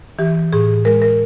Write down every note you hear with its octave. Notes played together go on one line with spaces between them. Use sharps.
E3 G4
A2 G#4
G#3 A#4
A#4